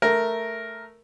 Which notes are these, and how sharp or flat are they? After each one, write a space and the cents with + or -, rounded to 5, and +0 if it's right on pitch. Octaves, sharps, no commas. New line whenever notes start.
A3 +0 A#4 +0